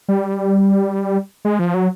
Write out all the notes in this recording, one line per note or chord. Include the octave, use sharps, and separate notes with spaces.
G3
G#3
F3
F#3